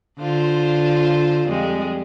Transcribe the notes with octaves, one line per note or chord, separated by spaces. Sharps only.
D3 F4 C5
F2 G3 G#3